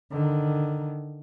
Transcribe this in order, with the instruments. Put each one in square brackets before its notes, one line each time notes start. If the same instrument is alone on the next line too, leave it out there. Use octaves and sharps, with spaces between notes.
[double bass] D3 D#3